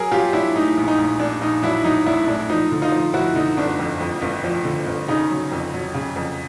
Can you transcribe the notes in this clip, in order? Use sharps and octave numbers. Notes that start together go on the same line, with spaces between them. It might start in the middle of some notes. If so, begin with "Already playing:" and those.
Already playing: F#3 G#4 A#4
F#3 F4 G4
F#3 D4 E4
A2 D#4
A#1
D#4
A#1
A#1 D4
A#1 D#4
F#3 D4 E4
F#3 D#4
A#1 D4 E4
A2 D4
F3 D#4
D3
D#4 F4
F3
F3 E4 F#4
D3 D#4
G1 D4
F2
F2
G1
F3
D3
G1
C#3 D#4
F#3
F2
F#3
C#3
F2